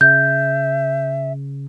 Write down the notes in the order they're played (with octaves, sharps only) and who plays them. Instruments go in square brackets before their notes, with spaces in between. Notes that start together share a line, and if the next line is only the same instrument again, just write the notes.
[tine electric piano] C#3 [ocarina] E5 [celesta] G6